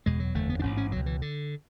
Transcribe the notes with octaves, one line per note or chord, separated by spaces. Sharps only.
F#1 E2 B2 G#3
F#3
F#1 E2 D3 A3
B3
D4
A1 G#2 C#4
C#4
C#2 B2 F#3
E3
D3